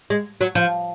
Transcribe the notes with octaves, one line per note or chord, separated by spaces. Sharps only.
G#3
F#3
F3